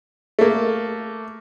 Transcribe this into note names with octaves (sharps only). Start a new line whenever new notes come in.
A3 A#3